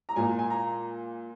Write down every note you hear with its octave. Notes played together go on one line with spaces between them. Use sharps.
A#5
A#2 G#3 G#5
G#5
A#5